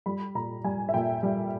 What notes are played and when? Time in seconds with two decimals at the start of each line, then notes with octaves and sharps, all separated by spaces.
0.06 G3 B5
0.35 A#2 A#5
0.64 G3 G#5
0.89 E5
0.94 A#2 G5
1.23 G3